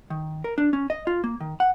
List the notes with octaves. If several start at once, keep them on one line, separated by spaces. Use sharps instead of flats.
D#3
A#4
D4
C#4
D#5
F4
A#3
D#3
F#5